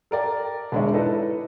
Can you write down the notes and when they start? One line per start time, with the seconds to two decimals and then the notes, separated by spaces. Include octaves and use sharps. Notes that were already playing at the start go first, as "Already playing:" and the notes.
0.11 A4 A#4 D5 G5
0.72 E1 D3 G#3 D4 C#5 E5
0.93 D#4 E4 A4 B4 D5 D#5